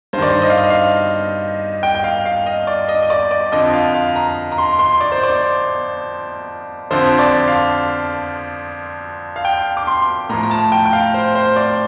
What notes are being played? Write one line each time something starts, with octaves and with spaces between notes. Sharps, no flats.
G2 D#3 C5 D5
C5
D#5
F5
D#5
F5
G5
G5
F5
F5
D#5
D5
D#5
D#5
D5
D5
F2 D3 F3 D#5
F5
F5
A#5
A#5
C6
C6
D5
C5
D5
F2 D3 F3 C5
D5
F5
F5
G5
D6
C6
A2 F3 A#5
A#5
A5
G5
G5
F5
C5
C5
D5